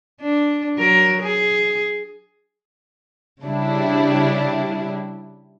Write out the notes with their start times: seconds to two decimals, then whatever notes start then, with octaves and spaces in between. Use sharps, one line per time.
0.21 D4
0.77 F#3 A#4
1.22 G#4
3.44 C#3 G3 D4 E4